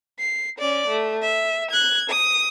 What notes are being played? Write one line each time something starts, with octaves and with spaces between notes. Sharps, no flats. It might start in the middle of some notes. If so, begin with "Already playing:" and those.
C7
C#4 D5
A3
E5
F#6 G#6
D#6